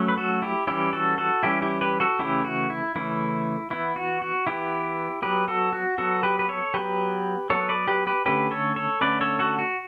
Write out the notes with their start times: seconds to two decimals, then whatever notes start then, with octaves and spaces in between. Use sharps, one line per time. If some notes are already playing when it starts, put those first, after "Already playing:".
Already playing: F#3 A3 C#4
0.08 B4
0.17 F#4 A4
0.42 E4 G4
0.67 E3 G3 C#4 E4 G4
0.93 F#4 A4
1.18 F#4 A4
1.43 E3 G3 C#4 E4 G4
1.62 E4 G4
1.81 G4 B4
2.00 F#4 A4
2.19 C#3 E3 A3 C#4 E4 G4
2.45 F#4
2.70 E4
2.96 C#3 E3 A3 C#4 E4
3.70 E3 B3 E4
3.96 F#4
4.22 F#4
4.47 E3 B3 E4 G4
5.22 F#3 B3 G4 B4
5.48 F#4 A4
5.73 F#4
5.98 F#3 B3 F#4 A4
6.23 G4 B4
6.39 B4
6.49 A4 C#5
6.74 F#3 B3 G4 B4
7.50 F#3 B3 A4 C#5
7.69 B4 D5
7.88 G4 B4
8.07 G4 B4
8.26 D3 A3 C#4 G4 B4
8.51 A4 C#5
8.76 A4 C#5
9.01 D3 A3 C#4 B4 D5
9.21 A4 C#5
9.39 F#4 A4
9.59 F#4